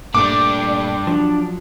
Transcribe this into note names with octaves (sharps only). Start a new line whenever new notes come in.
A#2 G3 A3 D4 D6
F3 F#3 D4